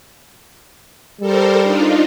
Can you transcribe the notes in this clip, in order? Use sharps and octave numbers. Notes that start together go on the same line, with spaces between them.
G3 A4 A#4 C5
D4 D#4 F4